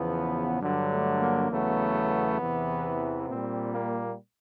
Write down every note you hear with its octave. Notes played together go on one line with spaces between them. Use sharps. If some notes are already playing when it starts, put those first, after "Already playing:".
Already playing: E2 C#3 F3 B3
G2 D3 F#3
A3
A#3
E2 C#3 F#3 A3 B3
E2 C3 E3
A#2 G3 C4
A#3